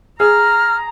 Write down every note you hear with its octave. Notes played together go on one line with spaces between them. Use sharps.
G#4 A#5 F6